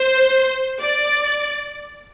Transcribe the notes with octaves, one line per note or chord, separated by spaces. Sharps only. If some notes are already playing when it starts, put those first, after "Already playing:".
Already playing: C5
D5